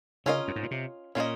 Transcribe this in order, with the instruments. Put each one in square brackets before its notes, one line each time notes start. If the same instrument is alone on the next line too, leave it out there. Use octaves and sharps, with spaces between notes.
[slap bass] C#3 [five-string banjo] C#4 F4 A#4 D#5
[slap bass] F#2
G#2
A#2
C3
[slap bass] A#2 [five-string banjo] C#4 F4 A#4 D#5